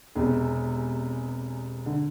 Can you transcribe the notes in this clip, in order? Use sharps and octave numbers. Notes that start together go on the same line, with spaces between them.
E1 E2 C3
D3